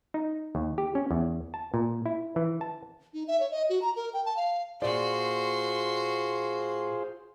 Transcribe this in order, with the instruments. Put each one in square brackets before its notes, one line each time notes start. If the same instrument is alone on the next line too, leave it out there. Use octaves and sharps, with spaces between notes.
[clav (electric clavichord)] D#4
D#2
G4
C#4
E2
A5
A#2
E4
E3
A5
[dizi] D#4
E5
C#5
D#5
F#4
A#5
A#4
G5
A5
F5
[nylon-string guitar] A#2 D5 [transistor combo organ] F4 G#4 C5 [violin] F#4 C6